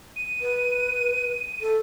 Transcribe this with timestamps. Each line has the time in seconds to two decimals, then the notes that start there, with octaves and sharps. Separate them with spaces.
0.16 D#7
0.41 B4
1.61 A4